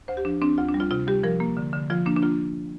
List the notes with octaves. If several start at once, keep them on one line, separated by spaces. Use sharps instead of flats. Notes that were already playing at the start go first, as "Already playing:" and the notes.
D2 C5
G4
F3 D4
C4 D4
D2 F4
D4
G3
F4
C3 F4
G3 G4
F3 A#4
A#3
D3
D3
F3 F4
A#3 D4
D4
A#3 F4